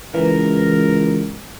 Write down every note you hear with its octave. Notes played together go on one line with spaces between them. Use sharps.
C#2 E3 A#4